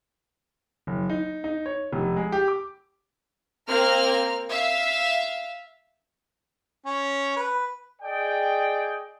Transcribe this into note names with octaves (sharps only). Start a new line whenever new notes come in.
F#1
D#4
D#4
C#5
F1
G#3
G4
D6
A#3 C4 A#4 F6
E5 F5
C#4
B4
G#4 D5 D#5 G5